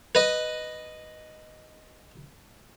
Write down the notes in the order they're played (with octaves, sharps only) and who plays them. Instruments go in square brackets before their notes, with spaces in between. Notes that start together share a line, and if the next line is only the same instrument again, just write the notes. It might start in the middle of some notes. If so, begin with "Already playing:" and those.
[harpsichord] B4 D#5